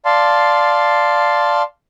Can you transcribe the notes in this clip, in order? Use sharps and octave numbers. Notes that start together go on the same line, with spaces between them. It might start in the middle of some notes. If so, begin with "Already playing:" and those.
D5 F5 A5 C6